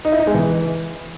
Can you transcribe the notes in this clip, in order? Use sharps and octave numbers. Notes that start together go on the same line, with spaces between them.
D#4
E4
D#4
G#3
E3